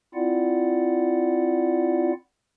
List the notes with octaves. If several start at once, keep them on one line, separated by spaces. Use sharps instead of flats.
C4 E4 F4 D5 F#5